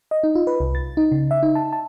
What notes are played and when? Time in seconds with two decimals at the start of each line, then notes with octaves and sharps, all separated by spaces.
0.11 D#5
0.23 D#4
0.35 F4
0.47 B4
0.60 C2
0.75 A6
0.97 D#4
1.12 C#3
1.31 E5
1.43 D#4
1.55 A5
1.73 A5